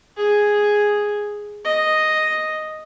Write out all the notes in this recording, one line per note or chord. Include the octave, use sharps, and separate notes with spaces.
G#4
D#5